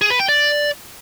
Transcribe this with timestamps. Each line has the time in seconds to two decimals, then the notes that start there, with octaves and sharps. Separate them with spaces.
0.01 G#4
0.10 B4
0.19 G5
0.28 D5